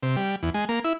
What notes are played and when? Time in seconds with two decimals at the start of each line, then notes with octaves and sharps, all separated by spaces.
0.03 C3
0.16 G3
0.43 E2
0.54 G#3
0.69 A#3
0.84 E4